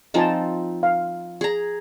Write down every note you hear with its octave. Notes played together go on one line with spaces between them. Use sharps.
F3 C4 D#4 D#5 G#5 A5
F5
G#4 A#5